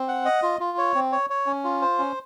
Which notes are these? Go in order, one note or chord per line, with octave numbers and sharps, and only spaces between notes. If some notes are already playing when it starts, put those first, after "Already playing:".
Already playing: C4
F#5
D#5
F4
F4
C#5
C4
C#5
C#5
C#4
F4
C5
C#4